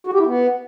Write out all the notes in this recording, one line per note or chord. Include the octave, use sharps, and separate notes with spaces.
F#4
G4
E4
B3